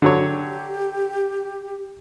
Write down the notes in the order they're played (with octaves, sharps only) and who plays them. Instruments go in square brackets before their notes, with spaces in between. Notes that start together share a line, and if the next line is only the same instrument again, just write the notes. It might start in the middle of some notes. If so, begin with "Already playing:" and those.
[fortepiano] D3 F#3 C#5 [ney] G4